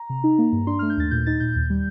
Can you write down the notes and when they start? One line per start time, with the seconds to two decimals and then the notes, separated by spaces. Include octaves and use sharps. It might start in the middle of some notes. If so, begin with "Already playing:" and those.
Already playing: A#5
0.10 C3
0.24 D#4
0.39 A#3
0.52 G2
0.67 D4 C6
0.79 A3 F6
0.90 G6
0.97 D#2 A6
1.11 A#2 G6
1.26 D#4 A6
1.40 A#2 G6
1.56 D#2
1.70 G3